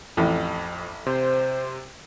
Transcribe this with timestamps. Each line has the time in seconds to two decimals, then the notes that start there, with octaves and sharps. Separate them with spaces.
0.17 A1 F2
1.06 C3 C5